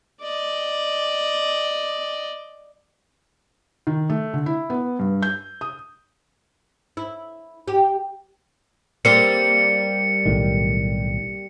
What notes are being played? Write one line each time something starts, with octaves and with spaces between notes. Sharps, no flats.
D5 D#5
D#3
A3
D3
E4
B3
G2
G6
D#6
E4
G4
G3 A#3 C4 C#7
B1 A2 D#3